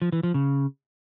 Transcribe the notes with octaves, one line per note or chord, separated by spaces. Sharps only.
F3
E3
F3
C#3